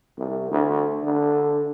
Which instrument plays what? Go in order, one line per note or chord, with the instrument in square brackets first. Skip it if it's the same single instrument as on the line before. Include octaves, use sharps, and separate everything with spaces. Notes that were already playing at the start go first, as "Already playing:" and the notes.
[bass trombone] C2
D2
D3